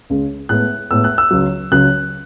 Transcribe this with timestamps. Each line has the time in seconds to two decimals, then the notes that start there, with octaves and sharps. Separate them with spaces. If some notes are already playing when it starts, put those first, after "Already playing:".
0.10 C#2 C#3 G#3
0.49 A2 G#3 B3 F#6
0.91 A2 G#3 B3 E6
1.04 F#6
1.18 E6
1.31 C#2 C#3 F#3
1.71 C#2 C#3 F#3 F#6